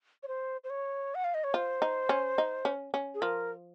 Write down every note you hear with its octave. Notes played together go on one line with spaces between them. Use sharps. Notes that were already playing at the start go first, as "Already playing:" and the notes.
C#5
C5
C5
C#5
F#5
F5
D#5
C#5
F4 C5
D#4
C#4
D#4
C#4
C#4
G#4
F3 A#4